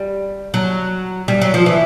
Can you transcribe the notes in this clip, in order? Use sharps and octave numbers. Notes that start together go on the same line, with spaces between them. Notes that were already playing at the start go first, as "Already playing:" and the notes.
Already playing: G3
F#3
G3
F#3
F3
E3